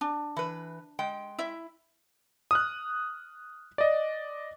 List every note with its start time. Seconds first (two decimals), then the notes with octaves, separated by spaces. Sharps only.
0.01 D4
0.36 E3 B4
0.99 G#3 G5
1.38 E4 E5
2.51 D#6 F6 F#6
3.78 D5 D#5